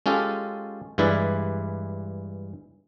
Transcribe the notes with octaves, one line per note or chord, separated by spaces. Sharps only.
G#3 C#4 F4 G4 A4
G2 E3 G#3 E4 B4 D5